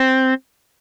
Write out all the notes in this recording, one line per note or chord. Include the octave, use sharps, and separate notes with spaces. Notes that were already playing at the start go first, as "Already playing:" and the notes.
Already playing: C4